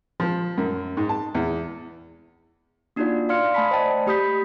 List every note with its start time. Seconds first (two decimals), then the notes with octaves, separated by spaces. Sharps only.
0.20 F3
0.58 F#2
0.97 G#2
1.09 A5
1.35 E2
2.96 A#3 D4 D#4 F4 F#4 D5
3.29 D5 F5 C6 F6 C#7
3.54 A3 G#5 A5 B5 B6
3.71 C5 D5 D#5 G5 A5
4.07 A3 G4 B5 D#6 G6 B6